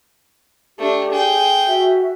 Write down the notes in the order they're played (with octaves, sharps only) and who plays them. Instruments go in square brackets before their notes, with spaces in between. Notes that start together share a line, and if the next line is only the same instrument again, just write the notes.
[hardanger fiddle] A3 D4 [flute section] G4
[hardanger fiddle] G#4 G5
[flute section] F#4 E5